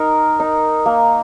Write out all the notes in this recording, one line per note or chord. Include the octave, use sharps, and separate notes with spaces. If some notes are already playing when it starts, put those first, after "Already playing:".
Already playing: D#4 A#4
D#4
A#3